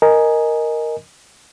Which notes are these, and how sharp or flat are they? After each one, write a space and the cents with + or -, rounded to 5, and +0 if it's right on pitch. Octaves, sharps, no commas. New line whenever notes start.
A#4 +0 D#5 -5 G#5 +5